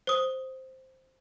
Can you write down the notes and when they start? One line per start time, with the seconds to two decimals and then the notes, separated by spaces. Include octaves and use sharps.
0.07 C5 D#6